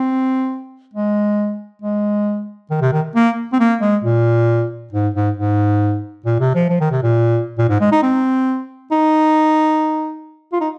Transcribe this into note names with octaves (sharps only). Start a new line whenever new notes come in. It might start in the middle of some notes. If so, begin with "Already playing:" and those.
Already playing: C4
G#3
G#3
D#3
C3
D#3
A#3
C4
A#3
G#3
A#2
G#2
G#2
G#2
A#2
C3
F3
F3
D#3
C3
A#2
A#2
G#2
G#3
D#4
C4
D#4
F4
D#4